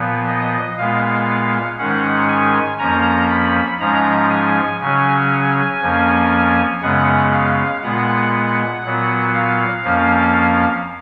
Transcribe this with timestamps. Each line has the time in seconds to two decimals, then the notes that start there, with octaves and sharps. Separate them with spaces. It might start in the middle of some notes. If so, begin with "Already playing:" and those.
Already playing: A#2 F3 B3
0.28 D#5
0.77 A#2 G#3 B3 F5
1.78 G#2 D#3 G#3 C#4 F#5
2.28 G#5
2.79 F2 F3 A#3 C#4 A#5
3.30 B5
3.80 G#2 F3 G#3 C#4 A#5
4.30 G#5
4.81 C#3 F#3 C#4 G#5
5.31 G#5
5.82 F2 F3 A#3 C#4
6.82 F#2 C#3 G#3 B3 F#5
7.32 F5
7.83 A#2 G#3 B3 F#5
8.34 F#5
8.84 A#2 F#3 B3
9.34 F5
9.84 F2 F3 A#3 C#4